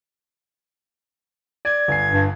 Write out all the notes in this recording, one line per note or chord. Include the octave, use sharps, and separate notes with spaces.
D5 G#6
G1 G#5 C7
G2